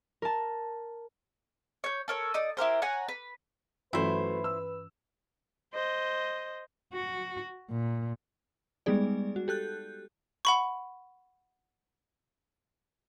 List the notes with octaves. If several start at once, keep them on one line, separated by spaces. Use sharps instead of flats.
A#4 A5
C#5 G6
A4 A#4 C#5
D#4 D5 D#6
E4 G4 A#4 C5
C#5 F#5 G#5 A#5
B4
G2 E3 F#3 A3 C#4 E4 B4 C5
E6
C5 D#5
F#4
A#2
G3 G#3 B3 D#4 G#4 D5
F#4
G4 A4 F#6 G6
F#5 B5 C#6